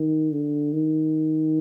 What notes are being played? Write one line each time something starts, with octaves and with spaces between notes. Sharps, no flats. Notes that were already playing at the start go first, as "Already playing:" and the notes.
Already playing: D#3
D3
D#3